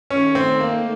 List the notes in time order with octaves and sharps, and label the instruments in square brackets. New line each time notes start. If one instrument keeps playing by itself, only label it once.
[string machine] D#3 A3 D#4 A4 [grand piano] C#4
[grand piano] C4
A#3